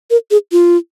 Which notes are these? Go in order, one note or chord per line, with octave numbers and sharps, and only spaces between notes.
A#4
G#4
F4